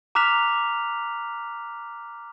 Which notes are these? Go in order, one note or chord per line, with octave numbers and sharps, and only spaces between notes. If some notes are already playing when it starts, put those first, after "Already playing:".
A#5 D6 F6 F#6 B6 F7